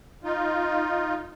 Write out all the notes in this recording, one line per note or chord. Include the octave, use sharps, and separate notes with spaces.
D#4 F4